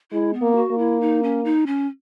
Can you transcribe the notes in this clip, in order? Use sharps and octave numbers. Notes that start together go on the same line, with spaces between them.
G#3 E4
B3
A#3
F#4
A#3
E4
D#4
C#4
D#4
C#4